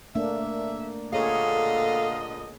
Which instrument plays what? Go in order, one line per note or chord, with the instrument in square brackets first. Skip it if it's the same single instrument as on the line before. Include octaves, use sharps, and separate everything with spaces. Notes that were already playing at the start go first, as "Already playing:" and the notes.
[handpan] A3 A#3 D4 [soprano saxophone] E5
[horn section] A#2 D3 D#5 [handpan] G#4 C#5 [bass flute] A4 [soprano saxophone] F5